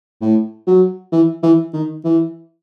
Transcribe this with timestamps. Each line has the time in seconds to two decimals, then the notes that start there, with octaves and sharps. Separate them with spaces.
0.21 A2
0.67 F#3
1.12 E3
1.43 E3
1.74 D#3
2.04 E3